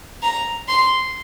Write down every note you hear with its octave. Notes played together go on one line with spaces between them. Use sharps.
A#5
C6